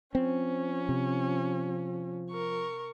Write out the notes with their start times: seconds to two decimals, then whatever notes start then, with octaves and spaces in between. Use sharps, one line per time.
0.15 F3 C4 C#4
0.89 C3
2.30 A#4 C#6